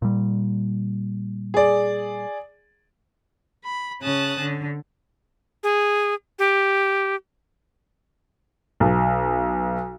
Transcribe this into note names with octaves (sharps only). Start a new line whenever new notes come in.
A#2 G3
G#4 D5
B5
C#3 C#4 A5 D#6 F#6
D3
G#4
G4
B1